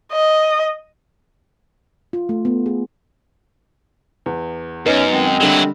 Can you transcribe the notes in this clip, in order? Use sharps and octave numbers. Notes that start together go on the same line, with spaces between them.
D#5
F4
A3
B3
G#4
E2
F#2 F#3 B3 C#4 D#4
D#3 G#3 C4
D3 F#3 G3 E4